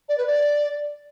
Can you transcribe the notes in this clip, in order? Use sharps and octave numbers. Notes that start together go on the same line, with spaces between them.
D5
B4
D5